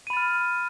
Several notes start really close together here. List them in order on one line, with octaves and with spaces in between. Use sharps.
D#7 B5 A6 F6